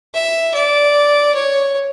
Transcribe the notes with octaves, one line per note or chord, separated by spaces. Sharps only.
E5
D5
C#5